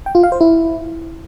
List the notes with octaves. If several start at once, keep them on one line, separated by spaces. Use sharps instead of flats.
G5
F4
F5
C5
E4